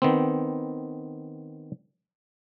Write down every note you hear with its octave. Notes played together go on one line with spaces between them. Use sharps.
D#3 B3 C4